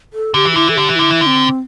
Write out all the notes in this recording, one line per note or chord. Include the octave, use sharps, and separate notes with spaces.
A4
D3 G4
E3
G4
D3 E4
E3 A4
D3 G4
E3
D3 E4
E3
D3
C4